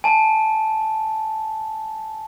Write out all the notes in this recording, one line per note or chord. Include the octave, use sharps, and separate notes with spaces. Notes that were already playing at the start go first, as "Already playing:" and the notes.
G#5 A5